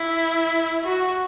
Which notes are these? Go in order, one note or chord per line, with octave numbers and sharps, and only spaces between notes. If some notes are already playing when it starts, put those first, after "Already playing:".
Already playing: E4
F#4